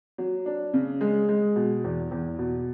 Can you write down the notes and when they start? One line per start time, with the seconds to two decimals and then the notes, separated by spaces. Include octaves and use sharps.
0.18 F#3
0.46 D4
0.74 C#3
1.01 G#3
1.29 G#3
1.56 B2
1.84 E2
2.11 E2
2.39 B2